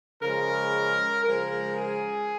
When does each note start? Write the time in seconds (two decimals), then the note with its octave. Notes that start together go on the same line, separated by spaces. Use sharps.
0.22 C#3 F3 G#3 A#4
1.24 C#3 F3 G#3 A#4
1.75 G#4